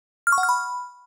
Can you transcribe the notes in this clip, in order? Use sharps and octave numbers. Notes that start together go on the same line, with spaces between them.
F6
C#6
F#5
F6
B5